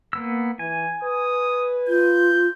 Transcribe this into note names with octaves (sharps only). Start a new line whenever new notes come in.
A#3 B3 E6
E3 G#5
B4 D#6
F4 G6